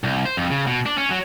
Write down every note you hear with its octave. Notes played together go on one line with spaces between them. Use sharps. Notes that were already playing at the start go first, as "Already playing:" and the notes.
C2
C5
F2
C#3
B2
D4
C#4
F#3